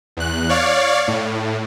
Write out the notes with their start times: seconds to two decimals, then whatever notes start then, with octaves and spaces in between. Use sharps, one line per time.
0.17 E2 F#6
0.49 C#5 D5 F5
1.08 A2